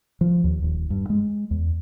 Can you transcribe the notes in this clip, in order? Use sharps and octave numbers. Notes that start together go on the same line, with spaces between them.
F3
D#2
D#1
G2
G#3
E2